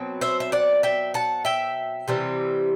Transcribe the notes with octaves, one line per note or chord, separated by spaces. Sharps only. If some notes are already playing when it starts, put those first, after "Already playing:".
Already playing: B2 F#3 C4
C5 E5
E5
D5 F#5
E5 G5
F#5 A5
E5 G5
C3 E3 G3 C4